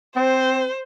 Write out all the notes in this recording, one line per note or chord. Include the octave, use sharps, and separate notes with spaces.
C4 C5